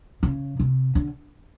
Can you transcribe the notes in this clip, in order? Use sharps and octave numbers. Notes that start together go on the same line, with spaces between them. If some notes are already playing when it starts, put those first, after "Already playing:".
C#3
C3
D3